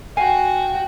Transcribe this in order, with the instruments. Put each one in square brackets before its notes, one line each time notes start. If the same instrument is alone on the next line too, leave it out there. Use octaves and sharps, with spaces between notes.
[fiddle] F#4 G5 [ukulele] F5 G#5